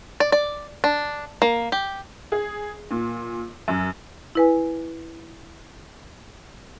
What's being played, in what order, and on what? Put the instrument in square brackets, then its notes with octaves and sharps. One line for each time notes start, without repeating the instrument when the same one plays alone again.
[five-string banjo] D5
D5
D4
A#3
G4
[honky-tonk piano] G#4
A#2
F#2
[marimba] E4 B4 G#5